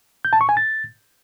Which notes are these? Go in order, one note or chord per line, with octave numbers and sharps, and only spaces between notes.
G6
A5
C#6
G#5
A6